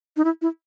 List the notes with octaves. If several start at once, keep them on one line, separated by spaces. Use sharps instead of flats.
D#4
E4
E4